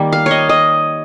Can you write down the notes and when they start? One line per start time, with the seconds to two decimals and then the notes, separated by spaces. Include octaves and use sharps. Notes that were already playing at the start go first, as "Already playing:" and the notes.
Already playing: D#3 G3 A#3
0.12 F5
0.26 C#5 D#5
0.49 D#5